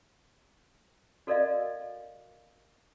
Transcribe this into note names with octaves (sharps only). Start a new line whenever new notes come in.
F#4 A4 A#4 D5 D#5 F5